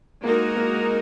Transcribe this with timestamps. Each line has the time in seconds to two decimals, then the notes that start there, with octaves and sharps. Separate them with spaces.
0.23 G#3 A#3 D#4 F#4 A#4
0.57 A#3